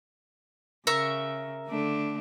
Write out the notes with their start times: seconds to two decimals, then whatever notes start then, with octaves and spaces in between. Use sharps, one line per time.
0.87 C#3 A#4 E5 C#6
1.68 D3 A3 D4